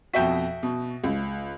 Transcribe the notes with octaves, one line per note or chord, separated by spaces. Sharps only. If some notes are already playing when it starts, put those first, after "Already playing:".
F2 B2 F#4 E5 G5 B6
B2
C#2